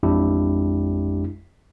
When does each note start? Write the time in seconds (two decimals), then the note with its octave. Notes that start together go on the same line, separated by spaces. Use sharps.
0.03 A1 F2 G#3 D4 E4 G4